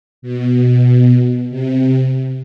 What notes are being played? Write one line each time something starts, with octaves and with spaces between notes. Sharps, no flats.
B2
C3